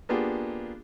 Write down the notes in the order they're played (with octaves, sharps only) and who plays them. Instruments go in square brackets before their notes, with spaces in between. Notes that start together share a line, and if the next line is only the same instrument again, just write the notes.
[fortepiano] A#3 B3 D4 F4 G4 G#4